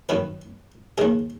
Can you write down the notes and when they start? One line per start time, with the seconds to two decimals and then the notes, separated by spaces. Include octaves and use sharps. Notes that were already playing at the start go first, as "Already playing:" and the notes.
0.09 F#2 D#3 B4
0.98 D#2 D#3 G#4